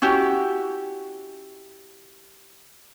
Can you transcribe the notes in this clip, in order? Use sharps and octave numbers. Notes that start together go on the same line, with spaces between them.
C#4 E4 F#4 G4